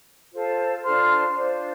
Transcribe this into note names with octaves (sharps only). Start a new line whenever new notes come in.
F4 A4 C5
D4 F4 A4 C5 C6 F6
D4 F4 C5